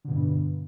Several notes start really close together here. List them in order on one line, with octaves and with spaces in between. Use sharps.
D3 B2 G2